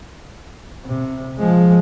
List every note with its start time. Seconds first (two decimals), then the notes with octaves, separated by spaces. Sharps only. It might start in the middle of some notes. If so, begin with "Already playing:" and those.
0.85 C3
1.38 F3 G#3